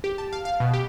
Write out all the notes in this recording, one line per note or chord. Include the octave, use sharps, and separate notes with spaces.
G4
A5
F5
F5
B2
G4